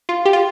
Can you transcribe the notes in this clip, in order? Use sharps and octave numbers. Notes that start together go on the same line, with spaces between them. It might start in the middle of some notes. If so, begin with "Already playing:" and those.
F4
G4
F4